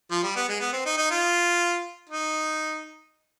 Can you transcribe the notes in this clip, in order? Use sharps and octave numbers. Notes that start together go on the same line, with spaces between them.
F3
G3
B3
G#3
B3
C4
D#4
D#4
F4
D#4